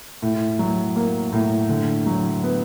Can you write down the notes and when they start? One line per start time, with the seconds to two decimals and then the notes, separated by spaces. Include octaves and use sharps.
0.22 A2
0.59 F#3
0.96 A#3
1.33 A2
1.69 D3
2.06 F#3
2.43 B3